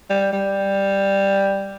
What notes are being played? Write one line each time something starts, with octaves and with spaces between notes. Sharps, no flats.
G3
G3